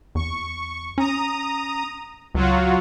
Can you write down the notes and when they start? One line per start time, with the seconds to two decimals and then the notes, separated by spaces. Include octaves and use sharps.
0.15 E2 C#6
0.98 C#4 A#5 D#6
2.35 C#2 F#3 F4 F#4